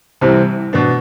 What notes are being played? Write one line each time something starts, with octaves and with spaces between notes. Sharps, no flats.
C2 C3 E3 G3 C4
B2 B3 D4